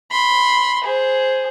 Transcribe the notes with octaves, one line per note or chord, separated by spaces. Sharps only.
B5 C6
G#4 C5